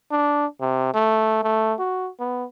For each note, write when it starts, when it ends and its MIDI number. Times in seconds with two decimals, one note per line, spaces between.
0.12 0.46 62
0.61 0.92 48
0.94 1.42 57
1.43 1.74 57
1.79 2.09 66
2.20 2.44 59